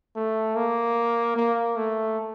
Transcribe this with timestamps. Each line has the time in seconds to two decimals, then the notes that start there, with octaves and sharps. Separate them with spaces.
0.16 A3
0.56 A#3
1.36 A#3
1.76 A3